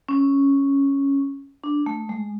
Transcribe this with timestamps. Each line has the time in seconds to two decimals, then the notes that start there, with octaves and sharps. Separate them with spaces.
0.09 C#4
1.64 D4
1.86 A3
2.09 G#3